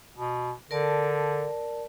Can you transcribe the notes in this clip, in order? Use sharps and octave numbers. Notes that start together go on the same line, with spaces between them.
B2
D3 A#4 D5 A5